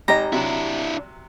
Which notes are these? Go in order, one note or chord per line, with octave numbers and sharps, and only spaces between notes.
G#1 G4 D#5 A#5
C3 F#3 D4 E4